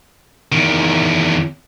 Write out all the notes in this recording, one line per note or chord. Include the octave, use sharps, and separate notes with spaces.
E2 D#3